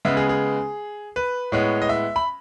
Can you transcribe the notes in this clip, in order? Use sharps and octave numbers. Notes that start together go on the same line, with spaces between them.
C#3 G#3 B3 E5
G#4
G#4
B4
A2 G#3 B3 C#5
D#5
E5
B5